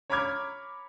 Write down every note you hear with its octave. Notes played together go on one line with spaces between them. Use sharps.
C#5 A#5 B5 D6 F6 G#6